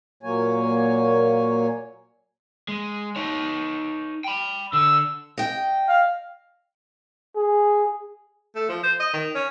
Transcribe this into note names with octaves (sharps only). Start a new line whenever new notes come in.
A#2 F#3 A#3 C#5 G#5
G#3
D#4 C#5
G5 B5
D3 E6
D#5 G5
F5
G#4
A3
F3
C5
D#5
D#3
C#4